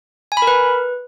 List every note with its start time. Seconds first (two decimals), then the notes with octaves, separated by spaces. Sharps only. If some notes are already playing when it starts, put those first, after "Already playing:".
0.32 G#5
0.37 B5
0.42 A#4
0.47 B4